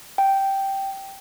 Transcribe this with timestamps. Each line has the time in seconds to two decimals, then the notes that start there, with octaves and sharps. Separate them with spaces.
0.18 G5